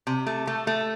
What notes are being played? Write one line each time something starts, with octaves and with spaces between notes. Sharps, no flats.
C3
A3
A3
A3